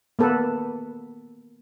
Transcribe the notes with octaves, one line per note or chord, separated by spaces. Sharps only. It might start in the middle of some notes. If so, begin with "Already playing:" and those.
A#3 B3 A4 B4